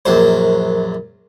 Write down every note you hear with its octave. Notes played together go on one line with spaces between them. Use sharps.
A#1 F#2 C5